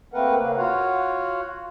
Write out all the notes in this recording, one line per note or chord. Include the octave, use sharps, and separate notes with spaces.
A3 A#3 C4 A#4 B4 F#5
C#3 A#3
F4 F#4 C#5 F5 F#5